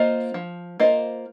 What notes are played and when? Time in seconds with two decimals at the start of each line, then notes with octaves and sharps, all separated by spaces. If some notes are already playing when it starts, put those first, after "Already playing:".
Already playing: A#3 F4 C5 D#5
0.34 F3
0.80 A#3 F4 C5 D#5